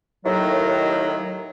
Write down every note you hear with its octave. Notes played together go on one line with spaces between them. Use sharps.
D#2 A2 D#3 F#3